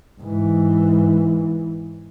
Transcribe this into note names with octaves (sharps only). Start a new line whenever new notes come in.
G#2 E3